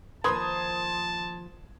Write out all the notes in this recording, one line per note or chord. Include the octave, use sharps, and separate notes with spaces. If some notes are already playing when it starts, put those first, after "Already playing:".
D#2 F3 A#4 B4 A5 C6 D#6 G#6